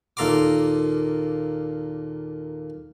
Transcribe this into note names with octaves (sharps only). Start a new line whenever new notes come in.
D#2 A#2 A4 A#5 C6 D6